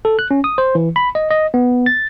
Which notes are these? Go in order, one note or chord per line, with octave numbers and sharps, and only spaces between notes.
A4
F#6
C#4
D#6
C5
E3
B5
D#5
D#5
B3
A6